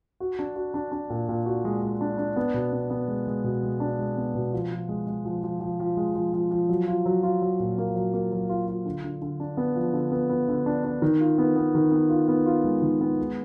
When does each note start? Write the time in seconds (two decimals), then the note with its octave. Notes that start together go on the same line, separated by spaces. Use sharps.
0.20 F#4
0.39 D4
0.56 F#4
0.74 D4
0.92 D4
1.10 A#2
1.29 A#2
1.46 F#4
1.65 G#3
1.82 G#3
2.01 D4
2.18 D4
2.36 B3
2.54 B2
2.73 B3
2.90 B3
3.08 G#3
3.27 G#3
3.44 B2
3.63 G#3
3.80 D4
3.99 G#3
4.17 B3
4.35 B2
4.53 F3
4.71 F3
4.89 G#3
5.07 G#3
5.25 F3
5.43 F3
5.60 F3
5.80 F3
5.97 G#3
6.15 F3
6.33 F3
6.51 F3
6.69 F#3
6.87 F4
7.06 F#3
7.23 F4
7.42 F#3
7.60 A#2
7.78 A#3
7.96 F#3
8.13 A#3
8.32 F#3
8.49 F4
8.68 F4
8.85 D3
9.04 D3
9.22 D3
9.40 D4
9.57 B3
9.76 F3
9.93 D3
10.12 B3
10.29 B3
10.48 D3
10.66 D4
10.84 D4
11.02 D#3
11.20 F4
11.38 B3
11.56 B3
11.75 D#3
11.92 B3
12.10 F4
12.28 B3
12.46 F4
12.64 G#3
12.82 D#3
13.01 B3
13.18 G#3